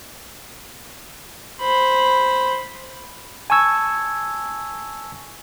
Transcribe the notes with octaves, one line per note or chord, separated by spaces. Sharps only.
C5 B5
G#5 A5 C#6 E6 G#6